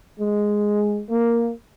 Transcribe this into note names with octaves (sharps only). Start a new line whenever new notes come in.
G#3
A#3